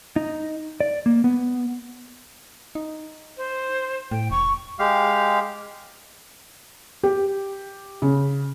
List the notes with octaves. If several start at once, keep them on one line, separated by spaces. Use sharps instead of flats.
D#4
D5
A#3
B3
D#4
C5
A2 G5
E1 C#6
G#3 G4 F5
G4
C#3